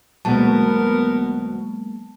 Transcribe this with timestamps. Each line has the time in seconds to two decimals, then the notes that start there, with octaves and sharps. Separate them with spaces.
0.25 D2 B2 F#3 G#3 A#3 B3 A#4 A5